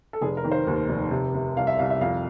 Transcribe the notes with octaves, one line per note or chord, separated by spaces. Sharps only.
A4
F1 G#4
A#4
D#3
C5
D#2
F1
C3
C3
C2 F5
E5
C2 F5
E5
F2 F5